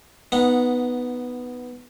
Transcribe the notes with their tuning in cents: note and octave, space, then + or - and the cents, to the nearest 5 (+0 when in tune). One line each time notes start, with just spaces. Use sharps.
B3 +0 D#4 +0 F#5 -15